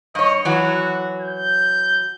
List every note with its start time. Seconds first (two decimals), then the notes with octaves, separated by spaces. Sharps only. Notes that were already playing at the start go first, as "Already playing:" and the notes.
0.15 G2 C#5 D#5
0.45 E3 F#3 F#4
1.21 G6